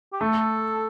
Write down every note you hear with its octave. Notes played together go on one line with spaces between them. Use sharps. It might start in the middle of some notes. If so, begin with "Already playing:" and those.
G4
A3 A4